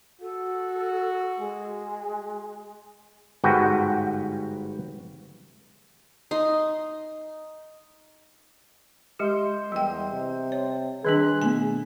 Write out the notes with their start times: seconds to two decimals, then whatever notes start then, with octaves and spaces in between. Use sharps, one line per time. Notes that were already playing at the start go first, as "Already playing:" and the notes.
0.21 F#4 A4
1.36 G#3
3.44 G1 G#2 F#4 B4 G5
6.31 D#4 C6
9.19 G#3 G4 D#5 C6 G6
9.72 E2 G3 G5
10.12 C3
10.52 C#5
11.05 D#3 G3 D4 G#4 C6 F#6 B6
11.42 B2 A3 B3 G#5